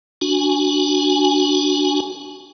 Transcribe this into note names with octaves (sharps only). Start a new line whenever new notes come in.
D4 F#4 G#5